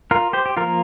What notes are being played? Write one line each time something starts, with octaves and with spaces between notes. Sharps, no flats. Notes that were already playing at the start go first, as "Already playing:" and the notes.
F4 A#4
G4 C5
G4
F3 A#3 F4 A#4